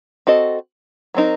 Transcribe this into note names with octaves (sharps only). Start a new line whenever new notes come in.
C4 F#4 A4 D#5
F#3 C4 D#4 A#4